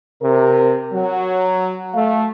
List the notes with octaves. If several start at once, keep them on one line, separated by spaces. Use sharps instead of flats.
C3 A#4
F#3
A3 F5